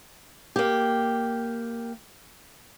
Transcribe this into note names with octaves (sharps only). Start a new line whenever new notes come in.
A#3 G4